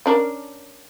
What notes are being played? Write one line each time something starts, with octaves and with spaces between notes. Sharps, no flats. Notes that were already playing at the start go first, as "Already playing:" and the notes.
C#4 D4 A#4